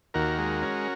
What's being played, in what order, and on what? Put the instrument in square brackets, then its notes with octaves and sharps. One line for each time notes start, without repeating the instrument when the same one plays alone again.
[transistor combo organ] D#2 F#4 A#4
G#3
C#4